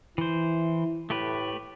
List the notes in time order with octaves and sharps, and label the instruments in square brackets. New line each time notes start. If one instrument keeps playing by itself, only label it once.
[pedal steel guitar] E3 C5 [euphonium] E4
[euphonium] A2 [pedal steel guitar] A3 G4 B4